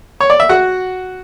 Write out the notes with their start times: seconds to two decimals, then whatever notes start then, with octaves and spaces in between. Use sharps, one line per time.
0.21 C#5
0.30 D5
0.40 E5
0.49 F#4 F#5